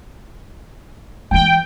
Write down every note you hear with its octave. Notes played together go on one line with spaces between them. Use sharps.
E3 G#3 G5